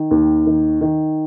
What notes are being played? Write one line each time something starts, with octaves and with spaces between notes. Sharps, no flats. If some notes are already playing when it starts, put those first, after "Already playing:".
Already playing: D#3
D#2
D#3
D#3